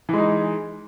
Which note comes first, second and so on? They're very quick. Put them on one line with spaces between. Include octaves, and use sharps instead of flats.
E3 G#3 D#4